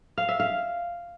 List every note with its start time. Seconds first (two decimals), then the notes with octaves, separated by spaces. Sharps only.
0.18 F5
0.29 E5
0.40 F5